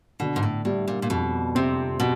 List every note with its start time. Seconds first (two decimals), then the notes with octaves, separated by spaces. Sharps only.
0.20 B2 D3
0.36 G#2
0.43 A2
0.65 A2 G3
0.88 A#2
1.02 A#2
1.10 F2 B2
1.55 C3 C4
2.00 B2